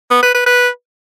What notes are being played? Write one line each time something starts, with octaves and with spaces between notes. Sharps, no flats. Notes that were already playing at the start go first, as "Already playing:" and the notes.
B3
B4
B4
B4